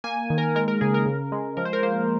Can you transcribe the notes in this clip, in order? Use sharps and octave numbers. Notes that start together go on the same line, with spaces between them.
A#3 G#5
D#3
A#4
G#3 A#4
A#4
C#3 G#4
A#4
C#3
G#3
F3 A#4
C5
A#4
A#3 C5